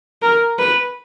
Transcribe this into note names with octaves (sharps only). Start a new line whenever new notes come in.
A#4
B4